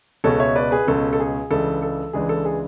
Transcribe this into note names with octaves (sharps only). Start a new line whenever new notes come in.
C#2 B2 G#3 C#4 A4 C#5
C#5 E5
B4 D5
G#4 B4
C#2 B2 G#3 C#4 A4
A4
G#4
C#2 C#3 E3 G#3 D4 A4
A4
C#2 C#3 E3 G#3 D4 G#4
A4
G#4